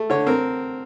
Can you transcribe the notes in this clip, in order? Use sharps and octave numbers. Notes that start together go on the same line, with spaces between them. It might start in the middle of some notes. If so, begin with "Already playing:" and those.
Already playing: A3
D3 C#5
C4 A#4